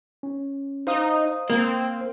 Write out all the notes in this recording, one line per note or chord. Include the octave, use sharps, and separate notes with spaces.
C#4
D#4 C5 F5 D#6
A#3 C4